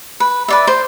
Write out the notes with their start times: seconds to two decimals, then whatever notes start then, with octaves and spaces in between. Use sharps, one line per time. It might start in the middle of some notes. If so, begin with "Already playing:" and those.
0.20 B4
0.48 B4 D5 E5
0.67 C5